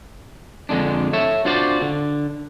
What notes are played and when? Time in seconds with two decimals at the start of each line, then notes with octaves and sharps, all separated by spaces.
0.69 F2 D3 G#3 D4
1.13 A4 C#5 E5
1.45 D4 F4 F#4 C5 D5
1.82 D3